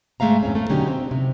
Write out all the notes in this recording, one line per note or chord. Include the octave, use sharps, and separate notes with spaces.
G#2 G#3 A3 E5 F5 A#5
F2 A2 C4 C#4
A3
B2 D3 F#3 C#4 D#4 G4
C4
C3